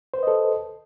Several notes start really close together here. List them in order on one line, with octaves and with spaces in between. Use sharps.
C5 B4 D#5 A4